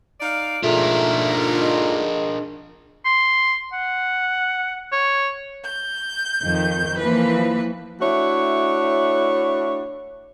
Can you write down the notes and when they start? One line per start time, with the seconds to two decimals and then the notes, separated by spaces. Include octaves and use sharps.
0.21 D#4 D5 F5
0.63 G#2 D3 A3 A#3 D4 F4 A#4
1.61 G#3
3.05 C6
3.73 F#5
4.92 C#5
5.66 G6
6.43 F2 D#3
6.97 E3 F3 A#3 B4
8.01 A3 D4 E4 F#4 C#5